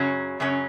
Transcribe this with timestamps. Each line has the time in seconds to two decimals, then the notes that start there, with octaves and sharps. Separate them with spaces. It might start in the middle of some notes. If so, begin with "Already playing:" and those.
Already playing: F#2 C#3 F#3 C#4
0.40 F#2 C#3 F#3 C#4